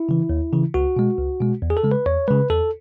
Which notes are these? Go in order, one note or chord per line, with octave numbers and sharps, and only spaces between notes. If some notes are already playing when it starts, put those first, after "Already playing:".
Already playing: E4
C#3 E3
D#2
C#3 E3
C#2 F#4
B2 G#3
C#2
B2 G#3
E2
G#4
A4
C#3 G#3
B4
E2 C#5
C#3 G#3 B4
E2 A4